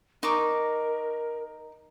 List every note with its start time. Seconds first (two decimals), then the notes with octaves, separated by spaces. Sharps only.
0.23 D#4 A#4 C#6 D6